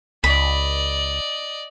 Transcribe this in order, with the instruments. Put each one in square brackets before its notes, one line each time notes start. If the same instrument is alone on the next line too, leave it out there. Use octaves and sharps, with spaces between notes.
[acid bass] C#2 [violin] D5 D#5 [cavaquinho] B5